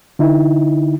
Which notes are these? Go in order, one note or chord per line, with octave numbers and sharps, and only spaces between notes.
D3 D#4 E4